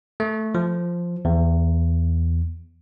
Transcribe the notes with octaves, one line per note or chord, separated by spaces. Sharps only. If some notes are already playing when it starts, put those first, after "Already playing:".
A3
F3
E2